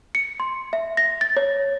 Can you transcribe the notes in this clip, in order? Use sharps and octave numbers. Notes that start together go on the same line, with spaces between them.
C#7
C6
E5
A#6
A6
C#5